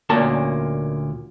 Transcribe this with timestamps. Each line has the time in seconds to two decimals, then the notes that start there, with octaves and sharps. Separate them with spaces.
0.09 D2 A#2 A#3 C#4 A5